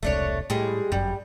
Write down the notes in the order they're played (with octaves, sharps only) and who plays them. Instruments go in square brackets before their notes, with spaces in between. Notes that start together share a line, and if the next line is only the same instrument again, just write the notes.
[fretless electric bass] E1 C2 [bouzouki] A3 D4 C#5
[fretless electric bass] A2 [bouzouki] G3 G#3 G#4
[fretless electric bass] G1 F#2 [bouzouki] G3